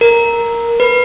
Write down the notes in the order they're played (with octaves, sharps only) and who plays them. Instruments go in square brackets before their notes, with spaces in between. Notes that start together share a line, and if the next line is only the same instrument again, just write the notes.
[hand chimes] A#4
B4